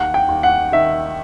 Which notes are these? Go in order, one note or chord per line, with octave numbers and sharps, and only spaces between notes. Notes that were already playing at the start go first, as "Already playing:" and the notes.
Already playing: D#2 F#5
G5
D#2
F#5
D#3 E5